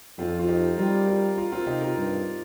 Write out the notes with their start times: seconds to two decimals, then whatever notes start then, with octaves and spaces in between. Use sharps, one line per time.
0.19 F2 C4 F4
0.39 F4
0.48 D#4 G4
0.78 G3 F4 A#4
1.07 F4 A#4
1.38 F4 A#4
1.52 C4 F4
1.66 C3 D#4 G4
1.81 F4 A#4
1.97 G2